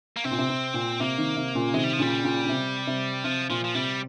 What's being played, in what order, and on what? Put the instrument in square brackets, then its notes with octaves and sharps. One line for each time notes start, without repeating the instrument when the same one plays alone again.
[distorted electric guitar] A#3
[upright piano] C3 [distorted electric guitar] C4
[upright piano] A#2
C3
C3
A#2
[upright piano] C3 [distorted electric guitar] A#3
[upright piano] C3 D#3
C3
A#2 C#3
[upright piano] C3 D#3 [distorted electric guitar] G#3
[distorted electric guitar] G3
F3
[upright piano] A#2 C#3 [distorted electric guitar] G3
[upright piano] A#2 C#3
C#3
C3
C3
[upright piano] C3 [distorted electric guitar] F3
[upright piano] A#2 [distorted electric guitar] F3
[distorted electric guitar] F3
[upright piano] C3 [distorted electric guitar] G3